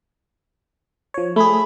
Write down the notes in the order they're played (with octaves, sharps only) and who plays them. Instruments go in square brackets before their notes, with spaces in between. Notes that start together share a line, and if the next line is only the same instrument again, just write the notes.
[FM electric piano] F3 C#5
[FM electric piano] A3 G#4 [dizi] B5